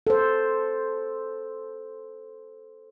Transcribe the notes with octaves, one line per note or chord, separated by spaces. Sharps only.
A4 C5